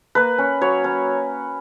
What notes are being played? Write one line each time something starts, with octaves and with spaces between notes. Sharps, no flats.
A#3 B4
C#4
F#3 C#5
C#4